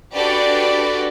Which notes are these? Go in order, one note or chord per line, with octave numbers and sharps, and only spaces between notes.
D4 F#4 G4 A4 B4 D5